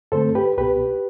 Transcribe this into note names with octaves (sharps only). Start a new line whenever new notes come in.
G2 D3 A3 C4 A4 C5
G4 B4
C2 B2 B3 G4 B4